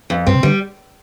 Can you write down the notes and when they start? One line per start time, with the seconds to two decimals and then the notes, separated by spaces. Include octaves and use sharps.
0.10 F2
0.27 G2 C4
0.35 C3
0.43 D3 G3